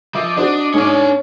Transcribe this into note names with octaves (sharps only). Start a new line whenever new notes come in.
F3 D#5 E5 D6
D4 F#4 C5 D5
G#2 C#4 D4 C#5